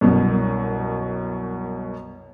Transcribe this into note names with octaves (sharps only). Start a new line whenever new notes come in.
C2 F#2 B2